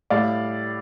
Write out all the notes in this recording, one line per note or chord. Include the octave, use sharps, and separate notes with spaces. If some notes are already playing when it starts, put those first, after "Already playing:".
A2 G3 D5 F5